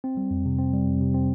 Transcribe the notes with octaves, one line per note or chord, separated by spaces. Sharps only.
C4
G3
F2
C3
C4
G3
F2
C3
C4